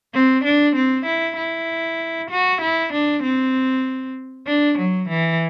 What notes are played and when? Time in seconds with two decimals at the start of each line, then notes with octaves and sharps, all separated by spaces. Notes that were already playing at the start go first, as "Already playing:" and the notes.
0.14 C4
0.44 D4
0.75 C4
1.06 E4
1.37 E4
2.30 F#4
2.62 E4
2.93 D4
3.23 C4
4.47 D4
4.78 F#3
5.09 E3